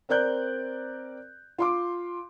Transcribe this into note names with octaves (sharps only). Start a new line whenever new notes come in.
C4 A#4 D5 F#6 G6
F4 C6 D6